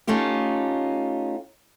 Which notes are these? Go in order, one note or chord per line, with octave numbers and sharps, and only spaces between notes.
A3 C#4 D#4 F4 G4